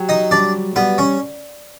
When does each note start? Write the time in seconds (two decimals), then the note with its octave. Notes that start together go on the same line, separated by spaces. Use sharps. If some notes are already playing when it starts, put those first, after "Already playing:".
Already playing: F#3 G4
0.09 D#4 D#5
0.31 G3 D4 D5
0.76 G3 B3 B4
0.98 C#4 C#5